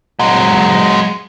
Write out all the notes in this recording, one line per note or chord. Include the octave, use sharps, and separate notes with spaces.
F#3 G#3